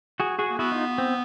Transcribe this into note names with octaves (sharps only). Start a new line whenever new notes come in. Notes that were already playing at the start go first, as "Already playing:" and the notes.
F#4 G#4
F#4 G#4
A#3
B3 E4 F#4
D#4 F4
C4